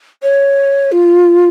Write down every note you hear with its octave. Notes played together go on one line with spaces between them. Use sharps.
C#5
F4